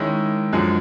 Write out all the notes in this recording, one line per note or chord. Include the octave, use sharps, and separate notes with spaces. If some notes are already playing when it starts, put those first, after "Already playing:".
Already playing: D#3 G#3 C#4 E4
F#2 D3 F3 G#3